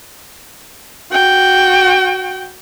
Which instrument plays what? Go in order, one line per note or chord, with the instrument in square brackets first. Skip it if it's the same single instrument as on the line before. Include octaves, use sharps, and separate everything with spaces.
[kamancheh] F#4 G5